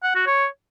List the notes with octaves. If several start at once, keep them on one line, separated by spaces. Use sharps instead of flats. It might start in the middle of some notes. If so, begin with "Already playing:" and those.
F#5
F#4
C#5